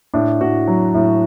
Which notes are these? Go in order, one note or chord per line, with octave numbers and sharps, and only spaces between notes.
A2 D4
A2 F#4
F#3
A2